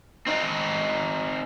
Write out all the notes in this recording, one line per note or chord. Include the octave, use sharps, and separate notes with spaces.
C4 D#4